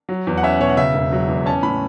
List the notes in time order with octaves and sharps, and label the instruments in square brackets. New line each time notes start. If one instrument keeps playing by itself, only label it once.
[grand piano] F#3
E2
F#5
C#4 E5
B2 C#5
F#5
C#3 E5
E1
F#3
E2
C#4 A5
A2 B5